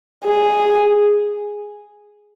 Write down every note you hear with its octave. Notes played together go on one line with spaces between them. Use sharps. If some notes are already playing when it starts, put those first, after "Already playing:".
G#4